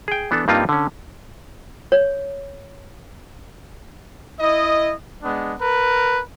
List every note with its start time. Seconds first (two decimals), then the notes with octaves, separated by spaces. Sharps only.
0.08 G#4 G5
0.31 E3 B3 D4 A4
0.48 G2 G3 A#3 C4 D#4 F4
0.69 D3 C#4
1.92 C#5
4.40 E4 D#5
5.23 G#3 B3 D4
5.60 A#4 B4